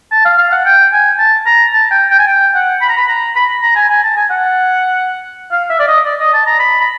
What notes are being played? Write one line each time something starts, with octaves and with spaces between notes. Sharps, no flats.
A5
F5
F5
F#5
G5
G#5
A5
A#5
A5
G5
G5
G#5
G5
F#5
B5
A#5
B5
A#5
B5
A#5
G#5
G#5
A5
G#5
F#5
F5
E5
D5
D#5
D5
D#5
A5
A#5
B5
B5